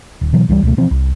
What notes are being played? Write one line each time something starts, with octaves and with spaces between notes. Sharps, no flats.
D1
B2 E3 F#3
C#2 E3 F3 G3
C#2 B2 A3
B2 E3 F3 C4
C2